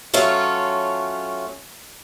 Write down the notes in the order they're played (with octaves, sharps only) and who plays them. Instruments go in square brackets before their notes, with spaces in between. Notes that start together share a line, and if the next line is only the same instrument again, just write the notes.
[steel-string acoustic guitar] F#3 A3 C#4 F4